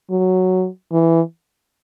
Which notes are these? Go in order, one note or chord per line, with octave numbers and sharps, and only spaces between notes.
F#3
E3